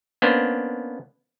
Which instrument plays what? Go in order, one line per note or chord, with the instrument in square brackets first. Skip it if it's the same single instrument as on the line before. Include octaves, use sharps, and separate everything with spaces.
[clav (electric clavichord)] A#3 B3 C#4 D4 C5